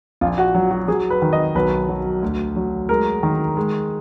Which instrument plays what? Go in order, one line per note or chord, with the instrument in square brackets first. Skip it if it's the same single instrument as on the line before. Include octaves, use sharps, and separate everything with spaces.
[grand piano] A#1 F4
F#4
F#3
F#4
F#3 G#4
B4
D#3
D#5
B1 B4
F#3
D2
F#3
G#3 A#4
D#3
G#3